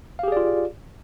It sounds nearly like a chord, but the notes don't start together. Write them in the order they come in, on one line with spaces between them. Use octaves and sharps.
F5 G4 G#4 D5 F4